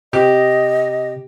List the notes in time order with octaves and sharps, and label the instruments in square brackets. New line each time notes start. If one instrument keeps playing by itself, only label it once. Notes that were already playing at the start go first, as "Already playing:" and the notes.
[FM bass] C3 [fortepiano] G4 [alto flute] D#5